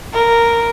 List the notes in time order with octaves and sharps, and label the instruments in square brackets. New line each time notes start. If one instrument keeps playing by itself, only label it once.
[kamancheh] A#4